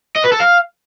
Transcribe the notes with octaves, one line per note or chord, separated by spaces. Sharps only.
D#5
B4
A4
F5